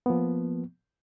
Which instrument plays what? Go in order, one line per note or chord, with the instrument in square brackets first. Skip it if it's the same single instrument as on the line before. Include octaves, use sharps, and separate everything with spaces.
[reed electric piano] F3 A#3 B3